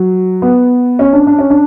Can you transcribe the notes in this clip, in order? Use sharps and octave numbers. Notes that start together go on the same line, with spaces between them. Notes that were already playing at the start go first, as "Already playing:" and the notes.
Already playing: F#3
B3
C#4
D4
D4
C#4
D4